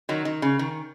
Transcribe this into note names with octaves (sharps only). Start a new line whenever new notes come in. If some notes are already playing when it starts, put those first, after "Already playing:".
D#3 F#3
D#3
C#3
D#3